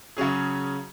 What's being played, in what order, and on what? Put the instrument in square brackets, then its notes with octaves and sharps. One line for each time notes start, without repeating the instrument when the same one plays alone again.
[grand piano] C#3 F#3 C#4 G#4